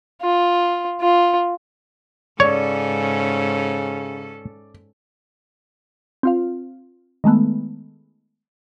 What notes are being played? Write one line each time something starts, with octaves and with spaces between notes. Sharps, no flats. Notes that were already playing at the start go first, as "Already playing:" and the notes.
F4
F4
G#2 C#3 C#4 A4 C#5 D5
C4 F4 F5
D#3 G#3 A3 B3